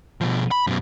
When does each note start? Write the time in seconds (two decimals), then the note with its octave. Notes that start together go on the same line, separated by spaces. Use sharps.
0.21 B2 F3
0.51 B5
0.67 F#2 B2